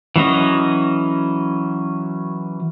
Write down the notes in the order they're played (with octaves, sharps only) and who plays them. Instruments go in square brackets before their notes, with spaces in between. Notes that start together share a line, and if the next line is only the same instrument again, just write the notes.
[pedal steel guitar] E3 F#3 C#4 D#5